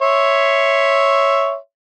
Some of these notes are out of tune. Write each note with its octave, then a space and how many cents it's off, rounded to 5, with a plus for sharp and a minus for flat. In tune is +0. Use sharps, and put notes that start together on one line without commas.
C#5 +0 E5 +0 C6 +0